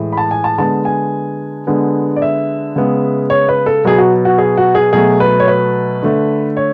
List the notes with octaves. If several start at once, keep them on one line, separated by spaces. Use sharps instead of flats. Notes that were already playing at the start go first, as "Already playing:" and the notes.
Already playing: A2 E3 G#3
B5
A5
G#5
A5
D3 G#3 B3 A5
G#5
D3 G#3 B3
D5
E5
C#3 G#3 B3
C#5
B4
A4
B2 F#3 B3 G#4
F#4
F#4
G#4
F#4
G#4
B2 F#3 A3 G#4
B4
C#5
B4
D3 A3
C#5